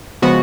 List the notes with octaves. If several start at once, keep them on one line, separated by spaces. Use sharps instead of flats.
C#3 F3 G#3 B3 F#4